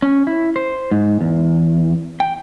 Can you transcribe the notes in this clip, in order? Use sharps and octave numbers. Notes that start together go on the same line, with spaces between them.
C#4
E4
C5
G#2
E2
G5